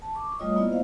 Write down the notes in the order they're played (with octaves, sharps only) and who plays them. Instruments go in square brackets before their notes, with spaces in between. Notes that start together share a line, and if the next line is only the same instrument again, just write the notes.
[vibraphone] A5
C#6 D6
G3 A3 F4 C#5 D#5 D#6
A#3 B3 E4 F4 D5 D#5
C5 F5